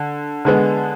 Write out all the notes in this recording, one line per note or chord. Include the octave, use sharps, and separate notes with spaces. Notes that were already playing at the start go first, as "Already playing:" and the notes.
Already playing: D3
D3 G#3 B3